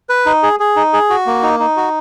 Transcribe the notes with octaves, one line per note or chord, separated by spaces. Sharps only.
B4
D#4
G#4
G#4
D#4
G#4
F#4
A#3
D#4
D#4
F#4